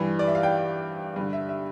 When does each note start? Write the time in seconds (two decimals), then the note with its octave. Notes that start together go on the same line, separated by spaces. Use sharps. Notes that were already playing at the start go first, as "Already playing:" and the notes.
Already playing: G2 E3 B5
0.19 D5
0.28 E5
0.35 F5
0.43 G5
1.16 G2 D3
1.33 E5
1.49 E5